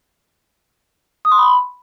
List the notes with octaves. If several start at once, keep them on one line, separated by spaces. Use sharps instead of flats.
D#6
C6
B5